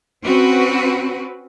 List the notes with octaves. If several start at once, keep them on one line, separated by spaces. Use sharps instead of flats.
C4 C#4 F#4 B4